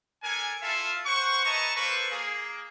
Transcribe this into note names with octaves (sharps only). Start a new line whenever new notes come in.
D4 A4 A#4 G#5
E4 F4 A4 E5 F5
B4 C5 F#5 C#6
E4 B4 D#5 A5 A#5 C#6
G3 A#3 A4 B4 C5 C#6
A#3 G#4